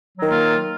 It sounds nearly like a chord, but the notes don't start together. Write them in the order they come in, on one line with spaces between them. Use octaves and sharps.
F#3 D#3 A#3 F4